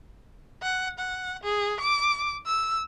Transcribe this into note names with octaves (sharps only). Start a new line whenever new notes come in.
F#5
F#5
G#4
D6
E6